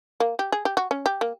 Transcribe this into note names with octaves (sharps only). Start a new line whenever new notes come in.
A#3
G4
G#4
G4
F#4
C#4
G4
A#3